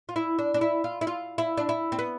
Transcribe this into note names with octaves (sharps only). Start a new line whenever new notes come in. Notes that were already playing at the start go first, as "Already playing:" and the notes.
F4
E4
D4
D4
E4
F4
E4
F4
E4
D4
E4
C4
B3